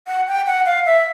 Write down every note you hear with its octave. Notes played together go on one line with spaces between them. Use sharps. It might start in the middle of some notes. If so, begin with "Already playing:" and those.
F#5
G5
F#5
F5
E5